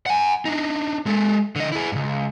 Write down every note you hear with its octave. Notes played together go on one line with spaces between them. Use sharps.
F#5 G#5
D4 D#4
G#3 A4
D3 D#5
E4 G#4
C#2 G2